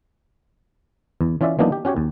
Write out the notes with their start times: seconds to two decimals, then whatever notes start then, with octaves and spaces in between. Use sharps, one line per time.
1.21 E2
1.41 E3 C#4 F4 D5 E5
1.59 E3 F#3 A#3 B3 D4 D#4
1.72 G4
1.85 C#4 F#4 G4 C#5
1.97 D#2